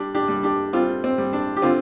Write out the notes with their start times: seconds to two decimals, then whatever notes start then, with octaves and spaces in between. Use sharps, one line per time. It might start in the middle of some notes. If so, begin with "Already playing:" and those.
Already playing: G3 D4 G4
0.15 D4 G4
0.28 G3
0.43 D4 G4
0.73 G3 C4 F4
1.04 C4
1.18 G3
1.33 D4
1.57 G4
1.62 D3 C4 F4